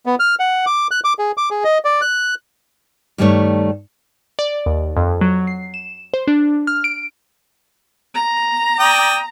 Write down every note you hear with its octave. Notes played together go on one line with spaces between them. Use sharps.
B3
F6
F#5
D6
F#6
D6
G#4
D6
G#4
D#5
D5
F#6
G2 D#3 G3 A3 C#5
D5
D#2
F2
F#3
C7
E7
C5
D4
F6
D7
A#5
D5 G5 D#6